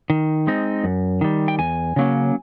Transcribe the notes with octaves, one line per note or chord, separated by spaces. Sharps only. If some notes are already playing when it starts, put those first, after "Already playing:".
D#3
G#3 C4 D#4
F#2
D#3 G3
G5
E2 G#5
C#3 F#3 A#3 C#4